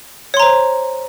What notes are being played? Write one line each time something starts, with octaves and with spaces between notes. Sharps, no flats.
C5 C#5 A#5 C6